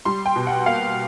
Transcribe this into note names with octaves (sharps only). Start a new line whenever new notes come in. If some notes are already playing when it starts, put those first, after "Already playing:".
G3 C6
G5
B2
F#5
A#3 F5